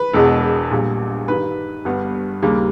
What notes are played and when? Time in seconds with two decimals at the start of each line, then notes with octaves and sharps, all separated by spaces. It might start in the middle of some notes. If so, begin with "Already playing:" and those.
Already playing: B4
0.13 E1 E2 B2 G#3 B3
0.71 A#1 A#2 G3
1.28 G2 D#3 G3 B4
1.85 G1 G2 G3 B3
2.42 D#2 C#3 G3 A#3